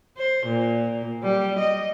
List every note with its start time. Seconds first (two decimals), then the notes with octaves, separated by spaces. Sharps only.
0.17 C5
0.46 A#2
1.23 G3
1.59 D#5